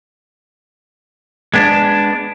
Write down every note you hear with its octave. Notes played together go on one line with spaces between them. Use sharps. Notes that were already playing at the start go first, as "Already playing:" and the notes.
G#3 B3 D4